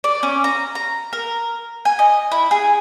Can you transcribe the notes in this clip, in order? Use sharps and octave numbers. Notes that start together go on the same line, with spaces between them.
D5
C#4
A#5
A#5
A#4
G#5
D#5
E4
G#4